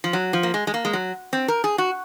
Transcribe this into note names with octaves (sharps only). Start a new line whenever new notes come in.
F3
F#3
F3
A#3
G#3
G#3
A#3
G#3
F#3
C4
A#4
G#4
F#4